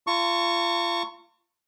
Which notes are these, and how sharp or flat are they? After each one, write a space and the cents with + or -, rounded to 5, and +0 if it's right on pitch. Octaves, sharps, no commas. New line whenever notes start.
F4 -30 A5 +45 C#6 +0